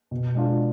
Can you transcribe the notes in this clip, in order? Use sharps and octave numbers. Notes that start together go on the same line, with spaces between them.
B2
G#3 D4 F4